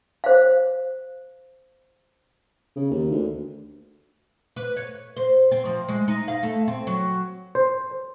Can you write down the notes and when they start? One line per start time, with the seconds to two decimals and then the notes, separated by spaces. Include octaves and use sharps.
0.24 C5 F5
2.76 C#3
2.90 D#2
3.11 D2
4.56 B4
4.76 C#5
5.17 C5
5.51 C4
5.65 F3
5.88 G#3
6.08 D#4
6.28 F5
6.43 A3
6.68 C4
6.87 F#3
7.55 C5